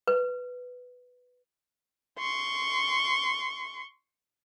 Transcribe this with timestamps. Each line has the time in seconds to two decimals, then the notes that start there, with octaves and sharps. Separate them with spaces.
0.07 B4
2.19 C6 C#6